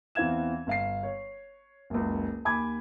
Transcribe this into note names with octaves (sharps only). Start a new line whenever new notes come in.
E2 E3 C4 F5 G#6 E7
G1 F5 C7
C#5
F#1 C#2
D#2 G#5 B5 D6 G#6